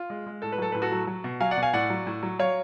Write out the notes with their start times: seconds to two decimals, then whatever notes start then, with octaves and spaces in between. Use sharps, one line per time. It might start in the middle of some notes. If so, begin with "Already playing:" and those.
Already playing: F4
0.10 G#3
0.26 G#3
0.42 A2 A4
0.52 B4
0.58 F#3 A4
0.72 A2 B4
0.82 F#4 A4
0.92 F#3
1.07 F#3
1.24 B2
1.40 F#3 F5 G#5
1.51 D5 F#5
1.57 B2
1.62 F5 G#5
1.73 A2 D5 F#5
1.90 F#3
2.07 A2
2.23 F#3
2.39 F#3 C#5 F5